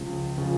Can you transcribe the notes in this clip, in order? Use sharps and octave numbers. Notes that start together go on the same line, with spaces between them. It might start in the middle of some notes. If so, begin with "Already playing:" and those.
Already playing: C#2 C#3 F3
C#3 F3